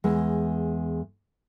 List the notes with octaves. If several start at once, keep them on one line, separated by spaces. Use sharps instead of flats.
E2 G#3